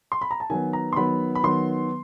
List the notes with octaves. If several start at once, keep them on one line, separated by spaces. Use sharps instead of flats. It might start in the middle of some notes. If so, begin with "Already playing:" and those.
C6
B5
A#5
A5
D#3 F#3 B3 G#5
A#5
C6
D#3 F#3 B3 B5
B5
D#3 F#3 B3 C6